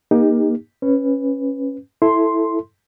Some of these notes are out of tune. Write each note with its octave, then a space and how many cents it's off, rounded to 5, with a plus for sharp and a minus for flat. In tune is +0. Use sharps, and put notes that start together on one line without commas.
A#3 +25 D#4 +0 G4 +40
C#4 -15 B4 +0
E4 +0 A4 +0 C6 +0